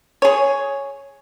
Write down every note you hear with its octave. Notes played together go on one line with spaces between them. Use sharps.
G#4 C#5